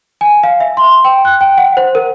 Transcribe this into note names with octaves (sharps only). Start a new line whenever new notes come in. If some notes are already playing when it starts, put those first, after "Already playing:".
G#5
F5
E5
C6
G5
F#6
G5
F#5
C5
A#4